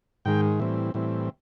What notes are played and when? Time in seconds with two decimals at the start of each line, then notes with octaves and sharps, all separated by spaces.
0.25 G#2 D#3 G#3 G5
0.60 A2 E3 G3 C4
0.94 A2 E3 G3 C4